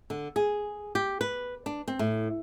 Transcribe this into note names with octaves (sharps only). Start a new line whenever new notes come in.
D3
G#4
G4
B4
D4
C4
A2